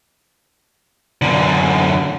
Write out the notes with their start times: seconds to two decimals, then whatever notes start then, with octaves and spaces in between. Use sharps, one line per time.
1.22 F#2 D3